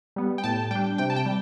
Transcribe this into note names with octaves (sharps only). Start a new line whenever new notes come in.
G3 B3
G5
A2 A5
G3 D4 G5
C3 G5
A5
G5
G3